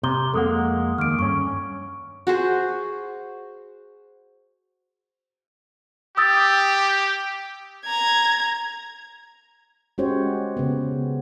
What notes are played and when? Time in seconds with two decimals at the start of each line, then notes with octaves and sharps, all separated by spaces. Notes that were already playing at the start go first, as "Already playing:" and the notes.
0.03 C3 A#5 G6 G7
0.34 F2 G#3 A#3 A4 F#5
0.98 D#2 F6 D7
1.19 G2 C#4 C#6
2.27 F#4 G#4 C5
6.17 G4 D#6 E6 A6
7.86 A#5 G#6
9.98 G#3 C#4 F#4 G4 C5 C#5
10.57 C#3 B3